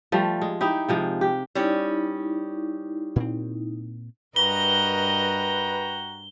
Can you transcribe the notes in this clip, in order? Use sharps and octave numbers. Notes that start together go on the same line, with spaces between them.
F3 G3 A3
G#3
D#4 E4 G4
C3 F3 G#3
G4
G3 C#4 D#4 E4
A#2 C4
G2 F#4 A#4 B4 D#5 G5 A#5 G7